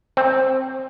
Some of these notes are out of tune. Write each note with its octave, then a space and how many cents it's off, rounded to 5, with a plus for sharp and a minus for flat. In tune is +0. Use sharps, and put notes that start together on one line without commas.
C4 +5